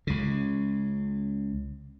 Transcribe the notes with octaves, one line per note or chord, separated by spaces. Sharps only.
C#2 C#3